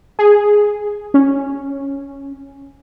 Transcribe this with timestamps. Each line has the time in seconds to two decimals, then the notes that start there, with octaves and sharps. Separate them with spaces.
0.19 G#4
1.14 C#4